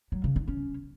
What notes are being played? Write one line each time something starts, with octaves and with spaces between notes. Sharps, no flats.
F#3
C#3
D4
C#4